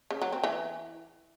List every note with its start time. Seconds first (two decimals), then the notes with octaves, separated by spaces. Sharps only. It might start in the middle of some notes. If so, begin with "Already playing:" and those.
0.11 C#3
0.22 F#3
0.33 C4
0.44 E3